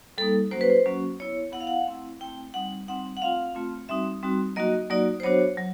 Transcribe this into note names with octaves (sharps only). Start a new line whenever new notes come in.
G3 A#3 D#4 A4
F#3 A#3 C#4 F#4 C5
B4
C5
F#3 A#3 C#4 F#4
B3 E4 C#5
B3 E4 F#5
F5
F#5
A3 C4 E4
A3 C4 E4 G5
G3 C4 D#4 F#5
G3 C4 D#4 F#5
F#5
A3 C4 F4 F5
A3 C4 F4
G3 C4 D#4 F#4 E5
G3 C4 D#4 F#4
F#3 A#3 D#4 F#4 D#5
F#3 A#3 D#4 F#4 D5
C5
F#3 B3 D4 F#4 C#5
F#3